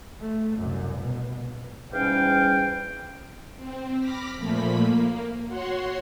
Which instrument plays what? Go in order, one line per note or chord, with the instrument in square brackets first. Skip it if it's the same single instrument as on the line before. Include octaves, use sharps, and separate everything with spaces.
[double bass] A3
C2 F#2
B2
[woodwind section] E2 G#2 G3 C#4 F5 G5
[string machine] C4
B5 D6 F6 A#6 B6
A#2 F3 A3 A#3 B5 B6
A#3
F#4 C#5 F#5 C6